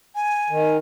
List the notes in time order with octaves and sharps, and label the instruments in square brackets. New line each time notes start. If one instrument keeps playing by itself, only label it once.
[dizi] G#5
[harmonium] D#3